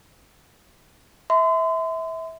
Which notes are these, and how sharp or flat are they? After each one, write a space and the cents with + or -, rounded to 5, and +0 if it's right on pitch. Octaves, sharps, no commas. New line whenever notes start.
E5 -25 C6 -40